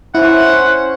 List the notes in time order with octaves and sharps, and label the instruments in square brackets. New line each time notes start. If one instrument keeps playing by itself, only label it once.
[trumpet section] C#4 C5 [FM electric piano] E4 [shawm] F#5